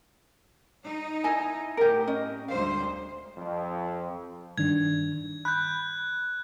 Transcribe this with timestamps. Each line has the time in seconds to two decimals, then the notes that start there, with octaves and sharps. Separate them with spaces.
0.85 D#4
1.24 E4 D#5 G#5
1.77 A2 G4 A#4
2.07 C#4 D#5
2.48 D2 G3 C5 F5
3.37 F2
4.58 G2 D#3 D4 G#6
5.45 B5 F#6 G6